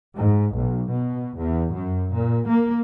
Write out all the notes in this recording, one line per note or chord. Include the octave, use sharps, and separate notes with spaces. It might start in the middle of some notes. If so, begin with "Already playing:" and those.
G#2
B1
B2
E2
F#2
A#2
A#3